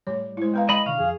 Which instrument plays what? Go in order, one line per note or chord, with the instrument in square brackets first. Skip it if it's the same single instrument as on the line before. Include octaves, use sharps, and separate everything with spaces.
[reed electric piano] A2 G3 [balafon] C#5
[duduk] G#3 [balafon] E4 C5
[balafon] B3 B4 F5 [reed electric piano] G5 A#5
[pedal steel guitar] D#5 B5
[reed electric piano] B2 D3 [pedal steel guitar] F5 [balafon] C#6
[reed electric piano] F2 [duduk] G#4